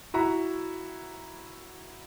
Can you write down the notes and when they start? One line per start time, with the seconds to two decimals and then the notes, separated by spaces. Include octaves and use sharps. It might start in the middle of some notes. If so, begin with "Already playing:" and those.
0.14 E4 F#4 A#5